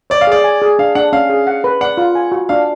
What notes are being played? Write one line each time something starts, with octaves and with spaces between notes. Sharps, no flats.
C#5 D5
F5
G#4 D5
G#5
G#4
D4 F5
D4 F#5
C#4 F5
G#4
F#5
B4
D5 F#5
F4
G#5
F#4
D4 F5